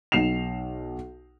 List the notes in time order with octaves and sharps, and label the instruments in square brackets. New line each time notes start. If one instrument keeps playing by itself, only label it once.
[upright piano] B1 C7 E7 F7